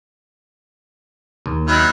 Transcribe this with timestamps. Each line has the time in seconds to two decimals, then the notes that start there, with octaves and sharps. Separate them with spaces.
1.46 D#2
1.67 D#3 F#3 E4